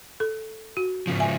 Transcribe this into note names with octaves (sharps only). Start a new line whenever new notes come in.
A4
F#4
G#2 C#3 F3
E5 G#5